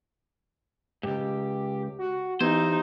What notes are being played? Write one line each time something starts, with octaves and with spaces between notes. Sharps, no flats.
C#2 G#2 G4
F#4
E3 B3 D#4 G4 C5 G#6